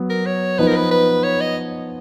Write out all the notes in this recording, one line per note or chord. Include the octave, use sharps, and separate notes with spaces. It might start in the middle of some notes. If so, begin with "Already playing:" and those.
Already playing: F#3 B3
A#4
C#5
F3 B3 D#4 B4
A#4
B4
B4
C#5
D#5